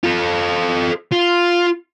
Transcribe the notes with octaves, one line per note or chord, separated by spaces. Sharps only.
F4 A4
F4